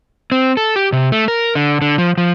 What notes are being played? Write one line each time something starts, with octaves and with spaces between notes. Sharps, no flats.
C4
A4
G4
C3
A3
A#4
D3
D3
F3
F3